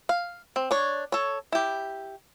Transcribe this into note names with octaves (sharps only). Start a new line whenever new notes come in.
F5
C4
D4 C#5
A4 C#5
E4 G4